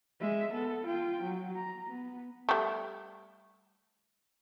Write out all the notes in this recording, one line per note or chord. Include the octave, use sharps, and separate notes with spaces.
G#3 E5
B3 A4
F4 G5
F#3
A#5
B3
G3 A3